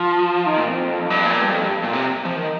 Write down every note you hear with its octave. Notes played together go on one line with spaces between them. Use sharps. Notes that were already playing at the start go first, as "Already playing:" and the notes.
Already playing: F3
D#3
A#2
F2
G2
A#2
G2
F2
G2
A#2
C3
F3
D#3